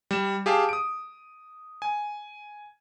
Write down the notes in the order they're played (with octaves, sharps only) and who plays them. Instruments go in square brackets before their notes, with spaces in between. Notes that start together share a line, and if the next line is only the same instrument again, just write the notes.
[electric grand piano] G3 E7
G4 G#4 F5 A5
D#6 D7
G#5